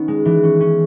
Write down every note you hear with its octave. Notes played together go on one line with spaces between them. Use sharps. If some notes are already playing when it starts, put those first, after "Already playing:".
Already playing: D#3 B3 C#4
G#3
E3
C#4
C#4